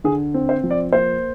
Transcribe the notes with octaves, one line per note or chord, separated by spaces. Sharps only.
D3 G#4
C4
C5
F3
D5
A#3 C5